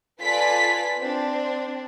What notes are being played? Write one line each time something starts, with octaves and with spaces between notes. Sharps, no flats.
F4 A4 B4 D5 G#5 B6
C4 D4